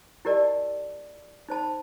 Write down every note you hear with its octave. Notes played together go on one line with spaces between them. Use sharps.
E4 G4 A#4 D5 D#5 A5
D#4 C5 A5 B5